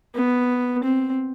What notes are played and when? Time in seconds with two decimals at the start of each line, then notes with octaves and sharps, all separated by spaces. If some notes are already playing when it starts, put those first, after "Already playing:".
0.15 B3
0.83 C4